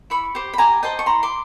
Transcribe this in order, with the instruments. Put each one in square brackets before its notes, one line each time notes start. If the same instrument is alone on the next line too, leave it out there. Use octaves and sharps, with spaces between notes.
[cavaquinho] E4 B5 C#6
G4 C5
B5
G4 G#5 A#5
C5 D#5 G5 A5
C#6
E4 A#5 C6
C6 D6